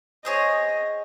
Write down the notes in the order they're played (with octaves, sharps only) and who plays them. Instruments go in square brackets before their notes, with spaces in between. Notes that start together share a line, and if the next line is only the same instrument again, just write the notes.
[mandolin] C4 G#4 C#5 [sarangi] D#5